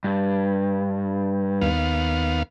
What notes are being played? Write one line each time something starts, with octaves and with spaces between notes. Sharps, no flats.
G2
D#2 B3 F5